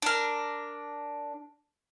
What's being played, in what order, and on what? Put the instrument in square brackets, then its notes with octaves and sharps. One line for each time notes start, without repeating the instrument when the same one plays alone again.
[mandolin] D4 A#4